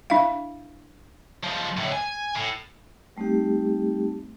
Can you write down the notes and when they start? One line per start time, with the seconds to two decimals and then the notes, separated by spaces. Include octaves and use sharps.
0.10 D4 E4 E5 F5
1.44 F3 G#3
1.77 C#2 A2
1.92 G#5
2.36 A2
3.17 G3 A3 C4 D#4 G4